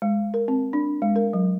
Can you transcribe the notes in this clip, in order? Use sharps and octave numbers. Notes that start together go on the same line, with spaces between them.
G#3
A#4
C4
D4
G#3
A#4
F#3